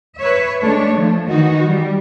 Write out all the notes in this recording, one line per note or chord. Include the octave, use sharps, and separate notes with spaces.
B4 C#5 E5
G#3 A3 D4 C#5
F3 A3
D#3 E3 D#4 F#4
G3